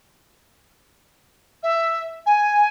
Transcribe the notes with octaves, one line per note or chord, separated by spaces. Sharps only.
E5
G#5